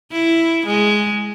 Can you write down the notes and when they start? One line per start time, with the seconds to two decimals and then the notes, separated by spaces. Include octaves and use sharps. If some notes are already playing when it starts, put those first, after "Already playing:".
0.11 E4
0.66 G#3